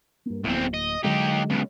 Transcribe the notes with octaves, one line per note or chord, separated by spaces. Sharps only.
G2 A#3
D1 E2 A#3 C4
D#5
D3 F#3 G#3 D#4 G4
C#2 B2